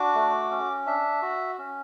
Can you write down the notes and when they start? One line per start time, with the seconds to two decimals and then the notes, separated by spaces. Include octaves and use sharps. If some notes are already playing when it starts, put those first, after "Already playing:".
Already playing: D4 F#4 D6
0.15 A3
0.51 C#4
0.86 D4 E5
1.22 F#4
1.58 C#4